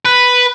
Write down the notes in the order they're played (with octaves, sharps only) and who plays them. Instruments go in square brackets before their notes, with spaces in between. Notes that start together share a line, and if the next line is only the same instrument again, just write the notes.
[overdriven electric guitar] B4